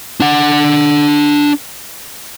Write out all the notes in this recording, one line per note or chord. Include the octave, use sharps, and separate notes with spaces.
D4 F#5